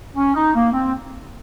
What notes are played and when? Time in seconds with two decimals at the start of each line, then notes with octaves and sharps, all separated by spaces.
0.16 C#4
0.35 D#4
0.54 A#3
0.72 C4